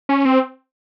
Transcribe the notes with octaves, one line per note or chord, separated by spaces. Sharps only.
C#4
C4